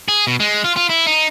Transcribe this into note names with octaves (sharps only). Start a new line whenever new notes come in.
G#4
B2
G#3
F4
F4
E4
D#4